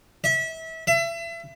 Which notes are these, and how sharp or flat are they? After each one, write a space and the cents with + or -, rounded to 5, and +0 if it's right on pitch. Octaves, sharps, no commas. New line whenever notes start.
E5 -30
E5 +30